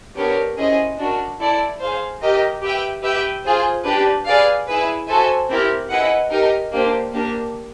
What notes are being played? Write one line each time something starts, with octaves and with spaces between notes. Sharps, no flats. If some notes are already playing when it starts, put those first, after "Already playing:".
B3 D4 G4 A#4 C#5
C#4 E4 G#4 C5 D#5
D4 F#4 A#4
E4 A4 D5
G#4 C5 F5
G4 A#4 D#5
G4 B4 E5 G5
G4 B4 E5 G5
F4 G#4 C5
D4 G4 B4
G#4 B4 D5 F5
E4 G#4 B4
F#4 A4 C5 E5 G#5
C4 E4 G4 A#4
E4 G#4 B4 D#5 F#5
D#4 G4 A#4
A#3 D4 G4 C5
A#3 D4 G4 A#4